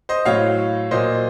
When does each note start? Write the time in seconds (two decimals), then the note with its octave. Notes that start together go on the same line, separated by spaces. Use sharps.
0.09 C5 D#5
0.25 A2 F#3 C#5 F5
0.91 A#2 F#3 C5 D#5